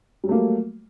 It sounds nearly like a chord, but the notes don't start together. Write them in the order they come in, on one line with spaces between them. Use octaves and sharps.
G3 F#3 A3 A#3